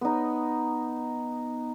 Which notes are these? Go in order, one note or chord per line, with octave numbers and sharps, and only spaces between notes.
B3 D#4